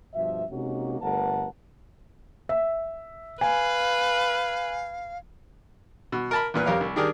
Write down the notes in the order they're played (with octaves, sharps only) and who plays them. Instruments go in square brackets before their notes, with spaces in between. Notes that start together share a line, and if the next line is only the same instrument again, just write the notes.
[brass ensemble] G2 B2 F3 E5
C3 G#3 A#3 C#4 D#4 F#4
G1 A3 A#4 B4 F#5 A5
[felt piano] E5
[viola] B4 [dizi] F5 [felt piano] G#5
[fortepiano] B2
A#4 A5 B5
E2 A#2 B4
F2 G4 A#4 C#5 F5
C2
D#3 D4 G4 G#4 A#4